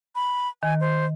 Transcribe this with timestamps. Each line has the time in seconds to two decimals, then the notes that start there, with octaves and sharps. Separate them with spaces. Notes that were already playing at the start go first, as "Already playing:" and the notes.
0.16 B5
0.63 D#3 G#5
0.81 C5